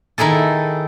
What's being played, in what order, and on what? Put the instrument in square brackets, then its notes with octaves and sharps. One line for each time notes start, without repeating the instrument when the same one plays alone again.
[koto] D#3 D#4 E4 G#4 A4